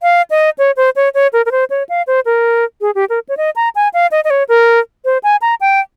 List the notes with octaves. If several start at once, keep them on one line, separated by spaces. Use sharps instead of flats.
F5
D#5
C#5
C5
C#5
C#5
A#4
A#4
C5
C#5
F5
C5
A#4
G#4
G4
A#4
C#5
D#5
A#5
G#5
F5
D#5
D#5
C#5
A#4
C5
G#5
A#5
G5